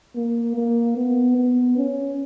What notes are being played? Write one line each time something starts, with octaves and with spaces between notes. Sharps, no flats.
A#3
A#3
B3
B3
C#4